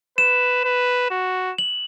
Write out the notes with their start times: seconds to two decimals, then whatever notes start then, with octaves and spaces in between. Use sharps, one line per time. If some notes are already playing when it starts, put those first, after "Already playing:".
0.18 B4 E7
0.64 B4
1.11 F#4
1.58 F#7